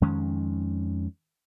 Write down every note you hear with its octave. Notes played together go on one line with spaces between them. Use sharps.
F2 D#3 G#3 C#4